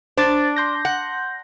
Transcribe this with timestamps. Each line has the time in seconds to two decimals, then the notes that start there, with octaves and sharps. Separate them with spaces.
0.17 D4 C5 A6
0.56 C6 G6 A#6
0.85 F#5